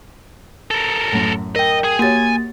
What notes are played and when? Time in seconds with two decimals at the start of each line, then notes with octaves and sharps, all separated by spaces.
0.71 A4 A#4
1.13 F#2 A2
1.56 A#4 D#5 G5
1.84 G#4
1.99 A#3 F#4 G4 C#5 G#5 A6